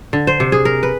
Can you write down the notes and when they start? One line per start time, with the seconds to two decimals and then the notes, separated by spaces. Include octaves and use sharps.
0.13 D3
0.27 C5
0.40 C3
0.52 G#4
0.65 A#4
0.83 B4